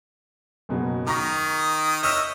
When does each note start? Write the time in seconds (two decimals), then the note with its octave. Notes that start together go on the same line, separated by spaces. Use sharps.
0.69 F#1 B2 F#3
1.07 D#3 A#5 C#6 D#6 A#6
2.03 C#5 D#5 E5 E6 F6 G6